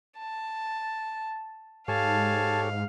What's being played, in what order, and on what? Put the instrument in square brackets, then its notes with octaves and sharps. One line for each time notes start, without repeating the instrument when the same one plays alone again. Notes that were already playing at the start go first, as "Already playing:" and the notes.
[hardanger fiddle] A5
[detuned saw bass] G#2 [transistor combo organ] G4 A4 C#5 [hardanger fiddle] F5 [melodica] G#5 A5